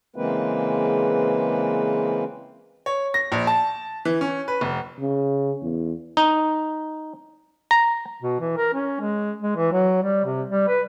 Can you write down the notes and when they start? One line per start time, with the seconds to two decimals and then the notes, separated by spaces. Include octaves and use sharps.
0.16 C#3 E3 G#3 A#3 C4 B4
2.86 C#5
3.14 A#6
3.32 A#1
3.47 A5
4.05 E3
4.21 C#4
4.48 B4
4.61 F1
5.00 C#3
5.62 E2
6.17 D#4
7.71 A#5
8.22 B2
8.40 E3
8.57 A#4
8.74 C#4
9.00 G#3
9.42 G#3
9.56 E3
9.72 F#3
10.03 G3
10.25 C3
10.50 G3
10.68 B4